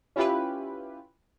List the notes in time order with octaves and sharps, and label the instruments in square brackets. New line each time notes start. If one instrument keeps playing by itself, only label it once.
[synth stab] C#4 E4 F4 G4 B4